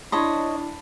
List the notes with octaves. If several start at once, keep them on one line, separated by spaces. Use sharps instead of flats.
D4 E4 C#5 D#5 A5 B5 C6